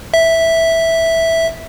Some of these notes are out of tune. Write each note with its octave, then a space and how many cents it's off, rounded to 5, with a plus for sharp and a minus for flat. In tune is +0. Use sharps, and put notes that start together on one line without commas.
E5 -5